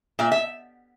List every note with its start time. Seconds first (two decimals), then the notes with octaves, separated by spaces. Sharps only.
0.19 A#2 E5
0.32 E5